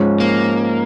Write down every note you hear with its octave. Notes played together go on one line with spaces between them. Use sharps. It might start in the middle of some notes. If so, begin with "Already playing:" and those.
Already playing: G#2 F3 G#3 C#4
A#3